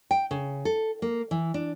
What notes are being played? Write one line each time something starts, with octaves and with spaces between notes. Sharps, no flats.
G5
C#3
A4
A#3
E3
D4